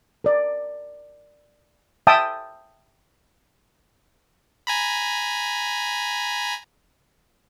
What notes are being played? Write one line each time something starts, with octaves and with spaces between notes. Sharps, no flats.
A#4 D5
E5 G5 A5 D#6
G#5 A#5 B5